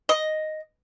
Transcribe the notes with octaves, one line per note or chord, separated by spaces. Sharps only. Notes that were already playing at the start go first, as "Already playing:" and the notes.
D#5